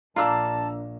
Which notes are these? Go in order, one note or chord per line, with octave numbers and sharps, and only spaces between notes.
A#1 A#3 D4 F4 A5 A#5 E6